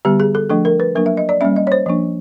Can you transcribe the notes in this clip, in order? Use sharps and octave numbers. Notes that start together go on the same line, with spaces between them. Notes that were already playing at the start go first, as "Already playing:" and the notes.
D3 G3 B3 G4
G#4
A4
F3 A3 D4 A4
A#4
B4
F#3 A#3 D4 A#4
E5
D#5
D5
G3 A#3 C#4 E5
D#5
C#5
C5
F3 A#3 D4